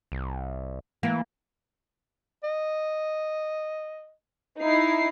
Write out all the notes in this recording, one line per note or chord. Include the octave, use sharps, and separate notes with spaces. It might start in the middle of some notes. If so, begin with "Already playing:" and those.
C2
E3 A#3
D#5
D#4 E4 C7